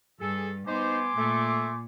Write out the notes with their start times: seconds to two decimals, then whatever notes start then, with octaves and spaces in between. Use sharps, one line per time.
0.20 G2 G#4 A4
0.68 B3 D#4 C5 G#5 C6 D6
1.17 A#2 A3